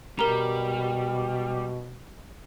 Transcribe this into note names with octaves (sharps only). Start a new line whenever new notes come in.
B2 G3 A#4 A#5